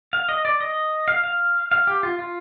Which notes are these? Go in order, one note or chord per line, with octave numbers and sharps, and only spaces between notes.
F5
D#5
D5
D#5
F5
F5
F5
G4
F4
F4